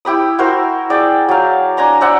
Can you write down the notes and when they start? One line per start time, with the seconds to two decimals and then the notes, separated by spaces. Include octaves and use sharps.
0.05 E4 G4 B5 D#6
0.39 E4 F#4 A#4 C5
0.90 G#4 D5 G5
1.29 F#3 F5
1.77 D4 G#5 A#5 C6
2.01 C5 D5 E5 F#5